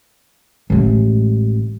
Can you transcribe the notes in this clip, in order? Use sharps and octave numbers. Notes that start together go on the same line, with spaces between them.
A1 G#3